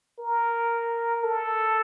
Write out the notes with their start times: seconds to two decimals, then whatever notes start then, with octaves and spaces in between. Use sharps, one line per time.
0.19 A#4
1.23 A4